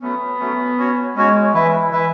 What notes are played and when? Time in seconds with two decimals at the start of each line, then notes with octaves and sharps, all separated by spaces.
0.01 F#3 A3 B3 C#4
0.40 F#3 A3 C#4
0.77 C#4 F#4 C#5
1.16 G#3 C#4 F#4 C#5
1.54 E3 E4 B4 E5
1.92 E3 E4 B4 E5